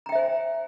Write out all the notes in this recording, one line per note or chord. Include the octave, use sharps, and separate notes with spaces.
C5 E5 G5 G#5 A#5